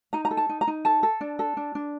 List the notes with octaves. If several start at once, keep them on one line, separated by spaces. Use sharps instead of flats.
D#4 A#5
A#5
A4
A5
D#4
A#5
D#4
A4 A5
A4
D4
A4
D4
D4